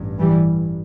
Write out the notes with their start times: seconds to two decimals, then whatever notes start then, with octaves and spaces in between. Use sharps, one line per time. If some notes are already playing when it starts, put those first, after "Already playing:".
Already playing: A1 G2
0.18 E3 G3